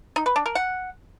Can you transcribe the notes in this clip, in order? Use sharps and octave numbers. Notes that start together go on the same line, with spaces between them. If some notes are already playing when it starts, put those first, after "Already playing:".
D#4
B4
D4
A#4
F#5